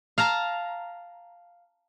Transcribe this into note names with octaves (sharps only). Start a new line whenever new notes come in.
F5 A5 A#5